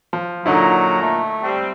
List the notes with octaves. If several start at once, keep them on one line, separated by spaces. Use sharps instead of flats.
F3
A#2 D3 F#3 D#4 E4 A#5
A3
G3 C4